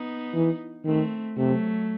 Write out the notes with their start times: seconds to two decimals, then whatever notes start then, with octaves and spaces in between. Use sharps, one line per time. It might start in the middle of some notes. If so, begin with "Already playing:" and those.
Already playing: B3 D#4
0.34 E3
0.85 D#3 A3 C4
1.37 C3 F#3 A3